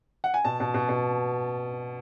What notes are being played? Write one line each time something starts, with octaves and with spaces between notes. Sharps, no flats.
F#5
G#5
B2 A5
B2
B2
B2